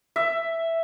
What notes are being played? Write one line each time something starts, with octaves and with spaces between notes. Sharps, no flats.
E5